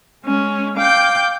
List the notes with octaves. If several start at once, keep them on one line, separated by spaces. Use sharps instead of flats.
G#3 C#4
F5 G5 D6 G6